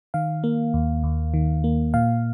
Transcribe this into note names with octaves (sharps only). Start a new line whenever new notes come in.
D#3 F5
A#3
D#2
D#2
D#3
A#3
A#2 F5